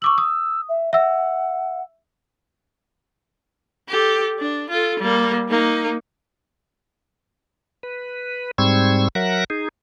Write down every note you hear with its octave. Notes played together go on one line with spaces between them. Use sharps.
C#6 D6 E6 F#7
D#6
E5
E5 F#5 E6
G4 A4
D4
F4 A4
G3 A#3
A#3 D#4
B4
G#2 G3 C4 C#6 E6 G#6
F#3 A#4 E5 F#5 F#6 A#6
D#4 G#4